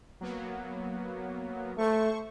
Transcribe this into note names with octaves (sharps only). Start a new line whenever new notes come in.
F#3 A#3 B3
A3 C5 C#6